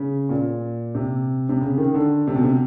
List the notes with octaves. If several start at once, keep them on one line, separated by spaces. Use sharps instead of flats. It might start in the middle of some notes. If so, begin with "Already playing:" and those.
Already playing: C#3
A#2
C3
C3
C#3
D#3
D3
C3
B2
C3